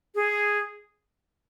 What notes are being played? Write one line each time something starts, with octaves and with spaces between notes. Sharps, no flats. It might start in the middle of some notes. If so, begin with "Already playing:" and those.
G#4